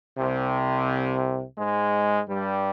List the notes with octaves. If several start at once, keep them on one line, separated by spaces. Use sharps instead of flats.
C2 C3
G#2 G#3
G2 G3